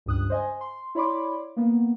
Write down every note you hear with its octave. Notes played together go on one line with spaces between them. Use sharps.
C#2 G2 D#6 F#6
C5 D#5 G#5
C6
E4 C#5 D5 B5 C6 D6
A#3 B3